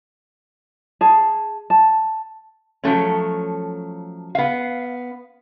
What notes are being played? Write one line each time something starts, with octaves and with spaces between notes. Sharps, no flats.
G#4 A5
A5
F3 F#3 A3 C#4
B3 F5